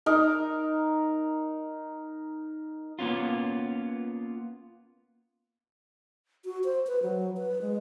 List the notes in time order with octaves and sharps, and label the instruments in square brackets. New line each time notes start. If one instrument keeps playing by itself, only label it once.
[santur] D#4 A#4
[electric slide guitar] A#3 B3 C#4 F4
[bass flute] F#4
C5
B4
F#3
B4
G#3